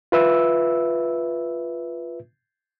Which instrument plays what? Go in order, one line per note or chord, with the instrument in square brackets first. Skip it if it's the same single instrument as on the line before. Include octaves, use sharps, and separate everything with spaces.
[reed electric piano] F4 B4 E5 E6